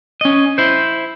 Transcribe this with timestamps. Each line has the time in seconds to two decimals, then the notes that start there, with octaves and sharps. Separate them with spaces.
0.21 C#4 D#5
0.58 E4 C5